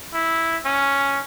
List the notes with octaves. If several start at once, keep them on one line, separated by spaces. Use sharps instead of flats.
E4
C#4